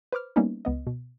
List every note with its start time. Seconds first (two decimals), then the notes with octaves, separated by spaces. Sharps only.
0.12 B4 C5 D6 F6
0.36 G3 A#3 B3 C#4 D#4 E4
0.65 C#2 B3 D#5
0.87 B2